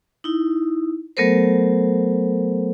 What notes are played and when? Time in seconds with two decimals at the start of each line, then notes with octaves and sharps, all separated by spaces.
0.24 D#4 E4
1.17 F#3 A3 B3 A4 A#4 C5